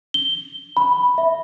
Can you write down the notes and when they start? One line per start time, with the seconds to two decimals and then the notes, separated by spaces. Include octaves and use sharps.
0.14 G7
0.77 B5
1.18 E5